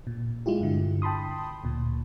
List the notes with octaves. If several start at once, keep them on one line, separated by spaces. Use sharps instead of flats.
A#2
G#3 E4 F4 G4
G2 D3
G5 A5 B5 C6 D#6
D2 A#2